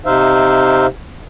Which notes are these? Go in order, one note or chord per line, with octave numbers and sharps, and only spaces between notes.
C3 D#4 C5 E5 F5